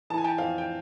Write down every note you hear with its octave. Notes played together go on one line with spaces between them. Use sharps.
E3 A5
G#5
G5 A5
F2 F5 G5
G5